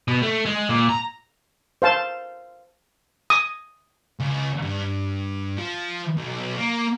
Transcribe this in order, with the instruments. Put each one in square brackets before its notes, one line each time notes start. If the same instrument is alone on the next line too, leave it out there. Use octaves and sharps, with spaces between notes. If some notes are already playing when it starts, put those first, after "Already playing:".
[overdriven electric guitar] B2
A3
G#3
A#2
A#5
[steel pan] C5 F5 A5
D#6
[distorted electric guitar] C#2
G2
F3
B1
A#3